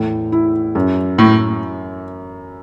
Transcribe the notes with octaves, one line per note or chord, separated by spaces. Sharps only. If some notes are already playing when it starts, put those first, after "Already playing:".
Already playing: E2 A2
E4
F#2
A2 E4